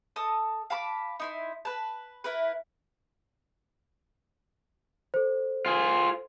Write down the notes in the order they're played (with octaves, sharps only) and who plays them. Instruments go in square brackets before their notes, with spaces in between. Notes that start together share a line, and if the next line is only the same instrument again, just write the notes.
[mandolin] A4 D#5 A5 D#6
F5 A5 B5 D6
D#4 E4 C6
B4 A5
E4 A#4 B4
[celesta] A4 C5
[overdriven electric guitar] F4 G#4